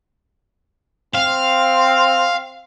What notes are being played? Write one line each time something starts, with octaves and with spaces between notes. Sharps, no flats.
C4 F5